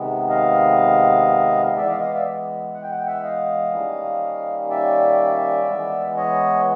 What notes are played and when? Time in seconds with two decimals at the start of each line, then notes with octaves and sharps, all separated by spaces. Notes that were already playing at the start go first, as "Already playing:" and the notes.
Already playing: C3 D#3 G#3 B3
0.29 D#5 F5
1.76 E3 G#3 B3 D5 E5
1.89 D#5 F5
2.00 D#5 F5
2.14 D5 E5
2.74 F#5
2.83 G5
2.91 F#5
2.99 G5
3.07 E5 F#5
3.23 D#5 F5
3.72 D#3 G3 A#3 C#4
4.70 D5 E5
5.68 E3 G#3 B3
6.17 C#5 D#5